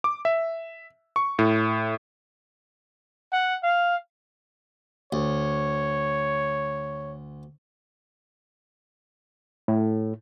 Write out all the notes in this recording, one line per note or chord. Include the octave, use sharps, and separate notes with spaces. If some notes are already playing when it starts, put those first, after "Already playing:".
D6
E5
C#6
A2
F#5
F5
D2 C#5
A2